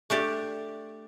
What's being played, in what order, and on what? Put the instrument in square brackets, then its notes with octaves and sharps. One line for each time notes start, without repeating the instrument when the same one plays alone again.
[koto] A3 D4 G4 D5